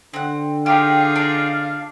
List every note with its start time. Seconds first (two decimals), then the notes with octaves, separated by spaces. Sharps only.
0.14 D3 C4 F#5
0.66 D#4 F4 G4 G#4 F5
1.16 D4